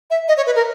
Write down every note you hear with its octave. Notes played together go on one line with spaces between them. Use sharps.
E5
D#5
C#5
B4
A#4